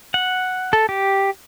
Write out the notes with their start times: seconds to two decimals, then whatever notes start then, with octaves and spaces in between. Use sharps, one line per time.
0.14 F#5
0.73 A4
0.89 G4